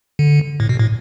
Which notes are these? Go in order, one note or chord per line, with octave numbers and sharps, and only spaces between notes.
D3
A2
B2
A2